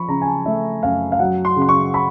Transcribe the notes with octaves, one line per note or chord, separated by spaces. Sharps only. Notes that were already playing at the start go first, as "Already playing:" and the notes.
Already playing: F3 B5 C#6
C#3 A#5
G#5
A5
A3 E5
F#2 F5
F5
F#3 F#5
C6
C#3
C6
C#6
B5